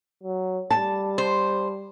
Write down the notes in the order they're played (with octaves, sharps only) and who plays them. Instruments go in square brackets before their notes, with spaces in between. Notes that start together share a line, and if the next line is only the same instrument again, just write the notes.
[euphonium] F#3
[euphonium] G3 [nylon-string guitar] A5
[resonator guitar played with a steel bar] C5